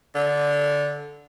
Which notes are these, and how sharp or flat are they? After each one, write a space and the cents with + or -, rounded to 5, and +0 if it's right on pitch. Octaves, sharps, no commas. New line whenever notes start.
D3 -10